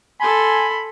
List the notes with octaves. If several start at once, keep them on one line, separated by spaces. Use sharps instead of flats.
A4 G#5 B5 C6